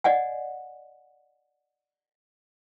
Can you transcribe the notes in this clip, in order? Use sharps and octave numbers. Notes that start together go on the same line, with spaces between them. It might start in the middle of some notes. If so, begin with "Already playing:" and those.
D5 D#5 F#5 G#5